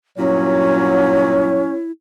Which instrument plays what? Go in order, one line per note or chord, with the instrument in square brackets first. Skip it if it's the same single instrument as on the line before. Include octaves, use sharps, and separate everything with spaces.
[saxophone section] G2 A#2 F#3 [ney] C#4 [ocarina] E4 [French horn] C#5